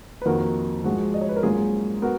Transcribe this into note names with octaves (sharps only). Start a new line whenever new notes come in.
B4
F2 D#3 A#3 F#4 A#4
G#2 F3 G#3 F#4
D#5
C#5
B4
A#4
G#2 F#3 A#3 C#4 F4 G#4
B3 F#4 A#4